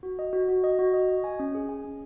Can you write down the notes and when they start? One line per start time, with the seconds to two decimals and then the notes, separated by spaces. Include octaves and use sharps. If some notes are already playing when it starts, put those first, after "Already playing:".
0.03 F#4
0.19 D#5
0.33 F#4
0.49 F#4
0.64 D#5
0.79 F#4
0.94 D#5
1.09 D#5
1.24 G#5
1.40 C#4
1.55 G#4
1.69 G#5
1.84 C#4